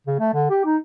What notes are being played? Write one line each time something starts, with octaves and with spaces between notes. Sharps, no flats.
C#3
A3
D3
G4
D#4